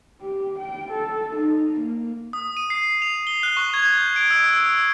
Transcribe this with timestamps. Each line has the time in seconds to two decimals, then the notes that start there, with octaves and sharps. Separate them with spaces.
0.21 G4
0.59 G5
0.91 A4
1.35 D#4
1.80 A#3
2.33 D#6
2.57 D#7
2.70 C7
3.02 F7
3.27 G7
3.43 F#6
3.57 C#6
3.74 G#6
3.98 G6
4.16 D7
4.31 E6
4.53 E6